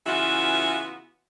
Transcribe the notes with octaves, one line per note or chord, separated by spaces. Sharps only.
C#3 E3 B3 F4 F#4 E5